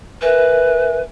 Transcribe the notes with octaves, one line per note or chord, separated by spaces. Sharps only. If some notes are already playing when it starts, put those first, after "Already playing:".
A#4 B4 E5 G#5